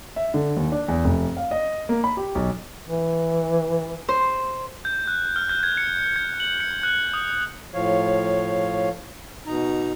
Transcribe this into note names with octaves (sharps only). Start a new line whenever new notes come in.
E5
D3
D#2
D4
E2
F1
F5
D#5
A#3
B5
G4
B1
E3
C5
G6
F#6
F6
G6
G#6
C#7
G#6
F#7
C#7
F#6
D#6
A2 F3 C#5 F5
B2 D#4 A#5